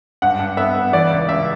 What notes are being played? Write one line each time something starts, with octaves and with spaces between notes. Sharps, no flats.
G2 F#5
G2
B3 E5
B3
E3 D5
C#2
C#2 E5